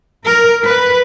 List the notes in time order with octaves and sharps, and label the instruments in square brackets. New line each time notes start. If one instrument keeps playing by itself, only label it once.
[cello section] A#4
B4